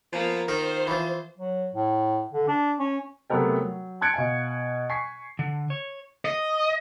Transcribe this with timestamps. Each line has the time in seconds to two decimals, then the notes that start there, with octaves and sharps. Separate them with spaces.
0.13 F3 A#3 B3
0.48 D#3 F4 A#4 C5
0.87 E3 F3
1.38 F#3
1.74 A2
2.33 D3
2.48 D4
2.80 C#4
3.30 C3 F#3 A3 B3 A#4 G5
3.63 F#3
4.01 A5 C6 F#6 G#6 C#7 D7
4.14 B2 F5 G#5
4.89 G#5 C#6 B6 C7
5.39 D3
5.70 C#5
6.25 D#5